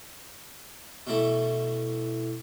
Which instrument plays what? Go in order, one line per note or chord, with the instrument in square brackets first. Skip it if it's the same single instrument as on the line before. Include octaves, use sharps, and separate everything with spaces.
[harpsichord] B2 E3 A3